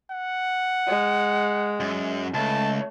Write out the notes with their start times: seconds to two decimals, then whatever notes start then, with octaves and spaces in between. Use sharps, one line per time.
0.11 F#5
0.87 G#3
1.80 F#2
2.34 C#2 A3 A5